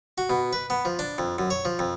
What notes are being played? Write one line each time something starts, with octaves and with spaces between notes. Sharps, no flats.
F#4
B2
B4
B3
F3
D4
F2
F#2
C#5
F3
F2